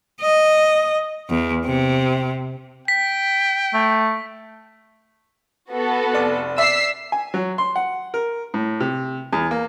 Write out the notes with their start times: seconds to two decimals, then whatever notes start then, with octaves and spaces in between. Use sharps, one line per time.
0.21 D#5
1.29 E2
1.65 C3
2.88 G5 B6
3.74 A3
5.71 B3 F#4 A4
6.13 F1 D5
6.58 D5 E5 E6 B6 C7
7.12 G#5
7.34 F#3
7.58 C6
7.76 F#5
8.14 A#4
8.54 A2
8.80 C3
9.33 E2
9.51 A#3